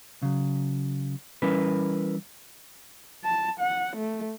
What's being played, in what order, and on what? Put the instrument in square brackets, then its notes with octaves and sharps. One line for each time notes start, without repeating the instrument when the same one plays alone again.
[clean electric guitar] C#3 F#3
E3 G3 C#4 E4 A#4 B4
[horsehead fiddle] A5
F#5
A3